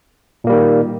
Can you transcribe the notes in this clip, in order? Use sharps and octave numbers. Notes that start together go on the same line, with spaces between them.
A#2 D#3 G3 A#3